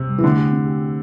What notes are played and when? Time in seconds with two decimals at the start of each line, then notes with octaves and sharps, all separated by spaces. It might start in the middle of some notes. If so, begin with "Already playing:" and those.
Already playing: A2 C3
0.09 G3
0.18 E3
0.24 D3 A3
0.38 G4
0.52 C4
0.66 G4
0.82 G4